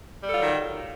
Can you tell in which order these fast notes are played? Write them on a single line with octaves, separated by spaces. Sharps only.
G3 A4 F4 F#3 D#3